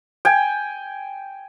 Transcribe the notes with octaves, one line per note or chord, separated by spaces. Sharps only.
G5 G#5